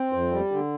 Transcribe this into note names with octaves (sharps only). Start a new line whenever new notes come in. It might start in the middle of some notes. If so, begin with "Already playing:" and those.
Already playing: C4
F2
G3
D3